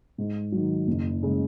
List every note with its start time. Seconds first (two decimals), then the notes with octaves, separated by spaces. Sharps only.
0.18 G#2
0.52 D#3 F#3
0.87 F#1
1.23 C#3 G#3